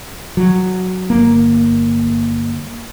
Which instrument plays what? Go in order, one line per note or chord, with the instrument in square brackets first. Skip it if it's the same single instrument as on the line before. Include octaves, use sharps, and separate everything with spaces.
[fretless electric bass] F#3
G1 A#3